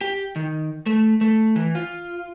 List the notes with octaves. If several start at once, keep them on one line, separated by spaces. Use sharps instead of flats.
G4
D#3
A3
A3
E3
F4